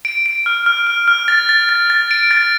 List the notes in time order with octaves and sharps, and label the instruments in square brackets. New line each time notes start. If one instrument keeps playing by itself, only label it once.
[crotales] D7
D7
F6
F6
F6
F6
A6
A6
A6
A6
D7
A6